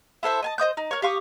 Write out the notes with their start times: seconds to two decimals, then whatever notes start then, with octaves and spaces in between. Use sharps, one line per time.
0.23 E4 A4 C5 E5
0.43 D#5 G#5 A5
0.58 C5 D#5 D#6 G6
0.77 D#4
0.91 A#4 C#5
1.02 G4 F5 C#6 D#6